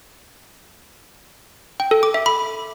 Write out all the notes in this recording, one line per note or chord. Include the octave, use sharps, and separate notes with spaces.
G5
A4
D6
E5
B5